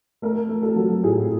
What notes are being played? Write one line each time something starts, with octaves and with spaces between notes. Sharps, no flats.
A3 A#4
A3
A4
F#3
A2 G#4